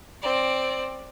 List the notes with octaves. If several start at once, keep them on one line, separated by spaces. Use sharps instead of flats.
C4 D5